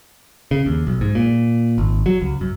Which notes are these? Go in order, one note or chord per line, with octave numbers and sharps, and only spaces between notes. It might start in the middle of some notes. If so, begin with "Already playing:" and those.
C#3
D#2
B1
G#2
A#2
G#1
F#3
C#2
F#2